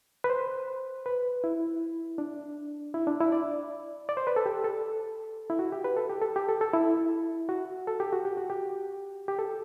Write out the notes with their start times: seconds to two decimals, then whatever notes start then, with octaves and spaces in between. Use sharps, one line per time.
0.24 B4
0.30 C5
1.06 B4
1.44 E4
2.18 D4
2.94 E4
3.07 D4
3.20 E4
3.32 D5
4.09 D5
4.17 C5
4.27 B4
4.36 A4
4.46 G4
4.64 A4
5.50 E4
5.59 F#4
5.72 G4
5.84 B4
5.96 A4
6.09 G4
6.21 A4
6.36 G4
6.49 A4
6.61 A4
6.73 E4
7.49 F#4
7.87 A4
8.00 G4
8.13 F#4
8.25 G4
8.37 F#4
8.50 G4
9.28 G4
9.39 A4